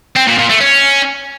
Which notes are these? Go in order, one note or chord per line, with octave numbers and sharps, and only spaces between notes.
C4
A#2
A#2
A3
C#4